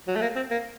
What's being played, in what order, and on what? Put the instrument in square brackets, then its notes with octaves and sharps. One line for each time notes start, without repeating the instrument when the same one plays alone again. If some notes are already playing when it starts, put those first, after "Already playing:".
[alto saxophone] F#3
A3
A#3
C4
A#3